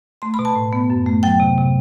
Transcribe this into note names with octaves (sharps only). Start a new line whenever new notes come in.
A3 C6
B5
B2
A5
A2
B3
F#2
A3
F#3 G5
C3
C3